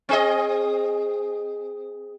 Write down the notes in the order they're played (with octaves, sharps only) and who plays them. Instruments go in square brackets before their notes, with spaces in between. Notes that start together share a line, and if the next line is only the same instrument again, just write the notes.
[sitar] C4 G#4 D#5